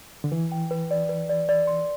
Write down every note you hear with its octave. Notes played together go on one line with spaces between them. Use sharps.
D3
E3 B4
G5
B4
D5
B4
D5
D5
C6